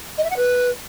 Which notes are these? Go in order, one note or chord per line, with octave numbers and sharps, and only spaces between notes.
D#5
E5
F#5
B4